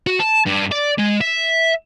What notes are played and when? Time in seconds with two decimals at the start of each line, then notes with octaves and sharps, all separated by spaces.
0.07 F#4
0.20 A5
0.46 G2
0.72 D5
0.98 G#3
1.21 E5